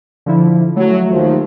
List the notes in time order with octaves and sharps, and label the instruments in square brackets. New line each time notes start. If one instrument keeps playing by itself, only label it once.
[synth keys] D3 F3 E4
[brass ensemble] F#3 [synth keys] A3
[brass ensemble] D#2 F3